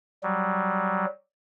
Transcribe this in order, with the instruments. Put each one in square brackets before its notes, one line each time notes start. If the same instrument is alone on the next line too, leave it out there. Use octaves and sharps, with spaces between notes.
[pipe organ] F#3 G3